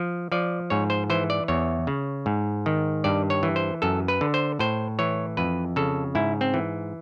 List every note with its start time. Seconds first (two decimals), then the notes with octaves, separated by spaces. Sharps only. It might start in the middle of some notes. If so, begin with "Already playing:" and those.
Already playing: F3
0.32 F3 D5
0.70 G#2 C#5
0.90 C5
1.10 E3 C5
1.30 D5
1.48 E2 C#5
1.87 C#3
2.26 G#2
2.66 D#3
3.04 G2 D5
3.30 C#5
3.43 E3
3.56 C5
3.82 F#2 A4
4.08 B4
4.21 D3
4.34 C5
4.59 A2 C5
4.99 E3 C#5
5.37 F2 B4
5.76 C#3 A4
6.15 G#2 E4
6.41 C4
6.54 E3